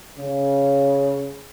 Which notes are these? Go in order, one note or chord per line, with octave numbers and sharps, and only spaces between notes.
C#3